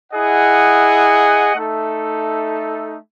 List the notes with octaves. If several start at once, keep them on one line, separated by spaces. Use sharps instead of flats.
E4 G#4 D#5 F#5
A3 D#4 A4 E5